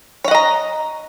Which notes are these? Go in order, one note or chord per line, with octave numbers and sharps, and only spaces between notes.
C#5 D#5 F#5 A#5